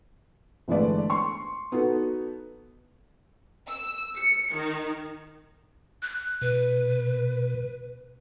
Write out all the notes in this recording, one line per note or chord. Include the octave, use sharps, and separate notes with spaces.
G1 E3 G#3 A3 B4 D5
C6 C#6
B3 D#4 F#4 A4
E6
C#7
D#3
F#6
B2 B4